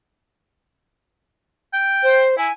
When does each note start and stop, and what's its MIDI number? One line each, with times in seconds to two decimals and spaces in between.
1.74 2.22 79
2.02 2.37 72
2.37 2.48 64
2.37 2.52 80